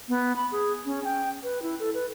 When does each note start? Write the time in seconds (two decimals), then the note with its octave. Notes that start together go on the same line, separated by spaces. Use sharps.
0.09 B3
0.36 B5
0.52 G#4
0.86 C#4
1.04 G5
1.43 B4
1.62 E4
1.79 A4
1.94 B4